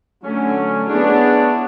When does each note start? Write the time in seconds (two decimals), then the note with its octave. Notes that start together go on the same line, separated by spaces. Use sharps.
0.24 D3 F#3 A3 C#4
0.89 B3 D4 E4 G#4 C#5